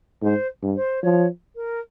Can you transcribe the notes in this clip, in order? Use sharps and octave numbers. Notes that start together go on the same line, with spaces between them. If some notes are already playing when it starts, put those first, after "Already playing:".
G#2 C5
G2
C5
F3 C#5
A#4